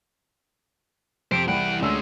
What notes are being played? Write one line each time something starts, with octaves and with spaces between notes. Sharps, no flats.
F2 G4 C5 D7
C2 E3 F#5 G5 B5 D7
D2 G#3 C#4 E6